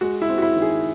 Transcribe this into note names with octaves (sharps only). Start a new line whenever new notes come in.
G#3 F#4
E4
C4
F#4
E4
D#3
G#4